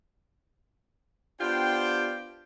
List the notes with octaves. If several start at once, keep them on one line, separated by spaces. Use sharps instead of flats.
B3 D4 F4 G4 C5 G5